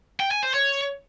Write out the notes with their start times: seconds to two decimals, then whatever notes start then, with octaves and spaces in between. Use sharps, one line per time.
0.20 G5
0.31 G#5
0.43 C5
0.54 C#5